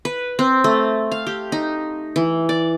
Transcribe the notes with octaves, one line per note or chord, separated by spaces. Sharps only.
B4
C4
A3
F5
G4
D#4
E3
D5